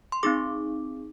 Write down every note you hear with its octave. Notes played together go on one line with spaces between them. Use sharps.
C6
C4 D#4 G#4 D6